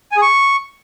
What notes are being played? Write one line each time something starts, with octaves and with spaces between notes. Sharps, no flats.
G#5
G#4
C#6